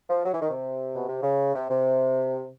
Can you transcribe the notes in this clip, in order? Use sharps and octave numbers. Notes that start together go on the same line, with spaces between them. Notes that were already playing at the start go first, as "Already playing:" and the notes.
F3
F#3
E3
D#3
C3
B2
C3
C#3
C3
C3